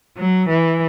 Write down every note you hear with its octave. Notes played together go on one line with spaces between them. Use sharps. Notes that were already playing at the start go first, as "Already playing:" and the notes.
F#3
E3